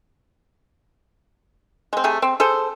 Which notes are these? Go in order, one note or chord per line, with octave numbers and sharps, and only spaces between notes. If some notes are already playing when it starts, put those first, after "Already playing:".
G#3 C4
C3 A3 G#4
C4
G#4 A4 C5